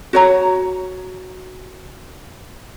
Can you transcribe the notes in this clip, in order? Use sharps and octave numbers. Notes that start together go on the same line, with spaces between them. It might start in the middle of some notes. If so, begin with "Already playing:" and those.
F#4 C#5 A#5